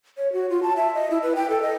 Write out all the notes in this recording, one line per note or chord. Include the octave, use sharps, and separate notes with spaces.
C#5
F#4
F4
A5
E5
D#5
E4
B4
G5
A4
D#5